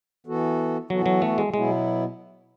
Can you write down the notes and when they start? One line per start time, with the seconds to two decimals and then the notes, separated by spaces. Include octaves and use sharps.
0.27 E3 B3 F#4 A4
0.90 E3 F#3 B3 F#4 A4
1.06 F#3
1.22 A3
1.38 G#3
1.54 B2 F#3 G#3 B3 E4